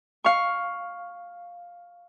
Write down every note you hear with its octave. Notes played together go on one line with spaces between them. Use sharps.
F5 C#6